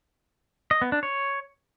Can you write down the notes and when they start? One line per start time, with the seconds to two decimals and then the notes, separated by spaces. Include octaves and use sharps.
0.71 D#5
0.82 B3
0.92 D4
1.03 C#5